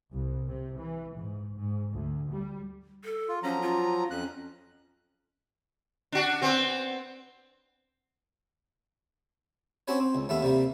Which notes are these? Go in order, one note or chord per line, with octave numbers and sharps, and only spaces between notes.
C2
C3
E3
G#2
G#2
D2
G3
A4
F4
F3 F#3 C#4 A#5
F4
F2 C#4 F#6
D4 F#4
B3 C4
C4 C#4 F#4 B4 C#5
C4
C#2
D#2 A3 B3 E5 F5
C3 G3 A#3